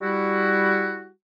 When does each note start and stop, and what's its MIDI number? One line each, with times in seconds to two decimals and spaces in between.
0.01 1.09 55
0.01 1.09 64
0.01 1.09 66